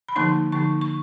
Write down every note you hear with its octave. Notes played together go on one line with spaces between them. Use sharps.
B5
D3 F3 A#3 D#4 C6
D3 F3 A#3 D#4 C#6
C#6